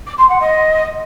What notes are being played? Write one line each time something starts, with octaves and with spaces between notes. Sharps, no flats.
D6
C6
F#5
D#5